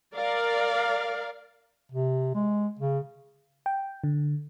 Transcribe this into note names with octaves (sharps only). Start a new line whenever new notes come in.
A#4 D5 F5
C3
G#3
C#3
G5
D3